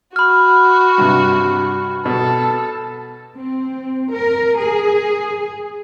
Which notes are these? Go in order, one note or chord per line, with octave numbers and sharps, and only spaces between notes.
F#4 B5 F6
G2 C3
B2 A4
C4
A#4
G#4